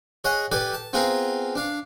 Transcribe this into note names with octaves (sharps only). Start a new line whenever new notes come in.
G#4 C#5 D#5 F#5
G4 A4 B4 D5 G#5
A5
B3 C4 F4 G#4 A#4
D4 F5